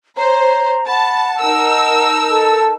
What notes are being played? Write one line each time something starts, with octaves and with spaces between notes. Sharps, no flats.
C5 C#5 A#5
F#5 A5 B5
D#4 A#4 A5 E6
A4 A5